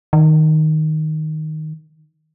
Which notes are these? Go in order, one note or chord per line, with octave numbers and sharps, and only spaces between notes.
D#3